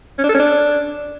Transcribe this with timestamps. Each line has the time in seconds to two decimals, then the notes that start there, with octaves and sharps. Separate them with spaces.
0.19 C#4
0.24 D4
0.29 A4
0.34 C#4
0.39 D4